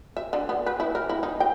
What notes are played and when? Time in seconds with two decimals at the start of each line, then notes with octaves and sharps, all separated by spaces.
0.17 E5
0.33 D3
0.49 B3
0.66 B4
0.80 E4
0.95 A#4
1.09 E4
1.23 D#4
1.40 G5